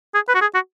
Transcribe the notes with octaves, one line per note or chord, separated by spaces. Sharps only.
G#4
B4
F#4
G#4
F#4